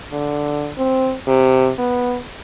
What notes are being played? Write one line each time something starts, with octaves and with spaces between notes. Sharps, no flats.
D3
C4
C3
B3